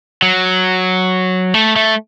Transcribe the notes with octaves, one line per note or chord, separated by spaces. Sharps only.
F#3
A3
A3